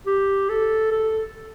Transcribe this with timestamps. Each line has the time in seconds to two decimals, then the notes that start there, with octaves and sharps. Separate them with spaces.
0.06 G4
0.49 A4
0.92 A4